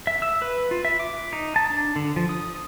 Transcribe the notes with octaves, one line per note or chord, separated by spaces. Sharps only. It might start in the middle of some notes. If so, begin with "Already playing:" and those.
E5
E6
B4
F4
E5
D6
D#4
A5
D4
D3
F3
D#6